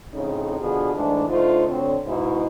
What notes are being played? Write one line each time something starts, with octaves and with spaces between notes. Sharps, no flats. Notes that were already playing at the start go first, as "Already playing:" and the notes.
F2 A2 C#3 C#4 D#4
B2 D3 F3 G#4
G#2 E3 A3 D4
D3 A3 D#4 F4 C5
D2 D3 C4 C#5
G#2 B2 E4